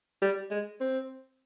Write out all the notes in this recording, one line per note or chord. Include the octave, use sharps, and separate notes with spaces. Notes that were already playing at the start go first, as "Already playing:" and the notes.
G3
G#3
C4